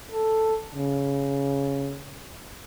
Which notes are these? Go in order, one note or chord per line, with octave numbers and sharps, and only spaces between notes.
A4
C#3